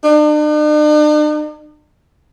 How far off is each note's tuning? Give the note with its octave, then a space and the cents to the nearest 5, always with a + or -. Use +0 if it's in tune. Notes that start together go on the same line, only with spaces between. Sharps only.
D4 +45